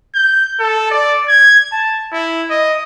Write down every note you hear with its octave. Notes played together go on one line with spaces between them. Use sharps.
G6
A4
D5
G#6
A5
E4
D#5